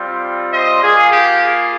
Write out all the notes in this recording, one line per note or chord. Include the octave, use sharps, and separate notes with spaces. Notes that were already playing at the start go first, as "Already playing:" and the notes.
Already playing: G3 C4 F4
C5 D#5
A#3 F4 G#4
G4
G#4